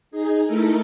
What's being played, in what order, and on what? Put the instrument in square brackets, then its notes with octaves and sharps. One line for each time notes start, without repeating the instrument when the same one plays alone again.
[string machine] D#4 G#4
A3 D#4 E4 A4 A#4